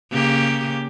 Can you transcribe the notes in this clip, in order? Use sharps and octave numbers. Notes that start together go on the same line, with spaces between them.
C#3 A#3 G4